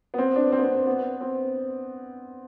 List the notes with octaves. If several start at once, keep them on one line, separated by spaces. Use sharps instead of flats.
B3
C4
D4
C4
B3
C4
C4
B3
C4